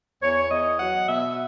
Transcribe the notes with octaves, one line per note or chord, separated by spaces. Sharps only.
E2 C#5
E2 D#5
F#3 F#5
B2 E5